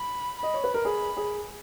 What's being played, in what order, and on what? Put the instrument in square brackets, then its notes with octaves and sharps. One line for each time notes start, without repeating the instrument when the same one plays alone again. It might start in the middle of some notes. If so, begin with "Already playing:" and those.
Already playing: [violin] B5
[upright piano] D#5 [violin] B5
[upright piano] C#5
B4
A#4
[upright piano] G#4 [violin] B5
[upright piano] G#4